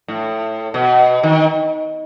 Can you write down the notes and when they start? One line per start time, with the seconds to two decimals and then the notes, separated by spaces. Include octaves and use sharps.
0.08 A2
0.74 B2
1.23 D#3